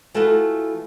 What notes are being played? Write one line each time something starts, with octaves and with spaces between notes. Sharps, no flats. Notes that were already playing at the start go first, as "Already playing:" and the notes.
E3 A3 F4 F#4 A4